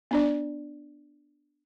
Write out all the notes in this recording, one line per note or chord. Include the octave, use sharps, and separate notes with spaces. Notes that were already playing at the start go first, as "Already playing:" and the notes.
B3 D4 D5